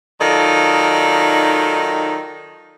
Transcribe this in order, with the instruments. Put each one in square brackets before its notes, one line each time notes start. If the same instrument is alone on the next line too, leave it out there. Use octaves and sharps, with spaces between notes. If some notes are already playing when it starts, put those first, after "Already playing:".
[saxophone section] D#3 F#3 D#4 F4 A4 D5